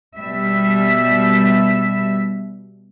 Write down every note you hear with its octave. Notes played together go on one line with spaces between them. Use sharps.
B2 G3 E5